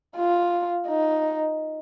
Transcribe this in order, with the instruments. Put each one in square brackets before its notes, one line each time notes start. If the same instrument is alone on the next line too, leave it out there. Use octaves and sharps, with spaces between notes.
[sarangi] F4
D#4